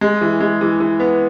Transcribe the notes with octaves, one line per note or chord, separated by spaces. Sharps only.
G#3
E3
G#3
E3
E3
B3